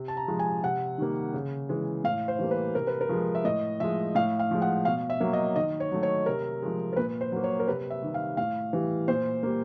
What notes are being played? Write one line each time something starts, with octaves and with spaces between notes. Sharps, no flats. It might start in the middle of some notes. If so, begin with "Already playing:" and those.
Already playing: C3
A5
A#5
F3 G#3
G#5
C3 F#5
D#3 G3 A#3
C#3
E3 G#3
A2 F5
C5
E3 G3 A#3
B4
C3 A#4
B4
A#4
F3 G#3
E5
A2 D#5
F3 G#3 E5
A2 F5
F5
F3 G#3
F#5
B2 F5
E5
F#3 A#3
D#5
D#3 D#5
C#5
F#3 A3
C#5
C3 A#4
F3 G#3
A#4
A#2 B4
C5
F#3 A#3
C#5
A#4
C3 B4
E5
D#3 G3
F5
A2 F5
E3 G3
A#2 C5
G3 A#3